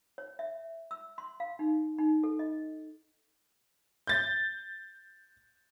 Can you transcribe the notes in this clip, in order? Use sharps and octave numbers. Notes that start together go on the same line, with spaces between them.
C#5
E5
E6
C6
F5
D#4
D#4
A4
D#5
G6 A6